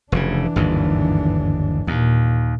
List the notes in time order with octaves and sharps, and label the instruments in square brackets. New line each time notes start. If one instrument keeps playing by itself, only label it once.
[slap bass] F1 C#3 [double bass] E3 D4
[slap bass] G1 D#2 G#2
[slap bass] D#2 [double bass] A#2